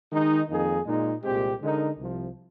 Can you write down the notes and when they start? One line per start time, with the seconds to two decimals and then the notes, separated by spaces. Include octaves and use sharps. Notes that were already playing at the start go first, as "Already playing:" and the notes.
0.12 D#3 G#3 D#4
0.48 F2 D#3 A#3 D#4 G#4
0.86 A#2 G#3 D#4
1.23 C2 A#2 G#3 C4 G4
1.59 D3 G#3 D#4 A#4
1.97 C2 C3 F3